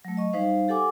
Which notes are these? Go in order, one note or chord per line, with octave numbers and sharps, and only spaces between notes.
F#3 A3
D#5 C#6
G3 D#4 C5 F5
G4 A4 F#5 G#5 D6